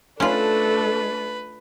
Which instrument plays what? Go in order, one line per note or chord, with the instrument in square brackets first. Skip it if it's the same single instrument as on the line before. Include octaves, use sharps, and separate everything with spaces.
[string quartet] A3 D4 [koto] C#4 F4 [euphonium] A4 [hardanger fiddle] B4